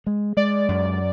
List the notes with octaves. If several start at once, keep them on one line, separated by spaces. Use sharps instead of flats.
G#3
G#3 D5
F#2